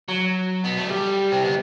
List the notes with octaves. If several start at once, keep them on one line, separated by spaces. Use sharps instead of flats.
F#3
B3
A3
G3
C4
B3